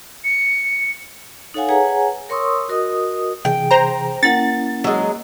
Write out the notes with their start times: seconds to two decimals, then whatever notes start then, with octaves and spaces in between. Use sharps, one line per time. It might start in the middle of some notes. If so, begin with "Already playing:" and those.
0.24 C#7
1.54 D#4 A4 C#5 F5 F#5 G#5
1.69 G#4 B4 C#5 F#5 G#5 A#5
2.29 A#4 C#5 C6 C#6 D#6 E6
2.69 F#4 A#4 D#5 D#6
3.45 C3 E3 G#4 G5
3.71 C5 A#5
4.23 A#3 C#4 E4 A#4 F#5 A6
4.84 F#3 G#3 E6